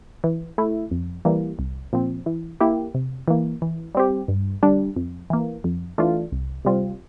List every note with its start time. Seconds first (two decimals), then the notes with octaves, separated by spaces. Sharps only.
0.24 E3
0.58 A3 E4
0.91 F2
1.25 E3 G3 A#3
1.59 C2
1.93 A#2 F3 C4
2.26 E3
2.61 A#3 E4 G4
2.94 C3
3.28 E3 A#3
3.62 E3
3.95 G3 C4 G4
4.28 G2
4.63 D3 G3 D4
4.96 F2
5.30 E3 A#3
5.64 F2
5.98 E3 A3 D4 F4
6.32 C2
6.65 C3 G3 C4 F4